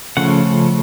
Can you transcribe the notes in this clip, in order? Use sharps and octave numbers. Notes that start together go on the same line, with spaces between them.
C#3 F3 A3 C#4 F#5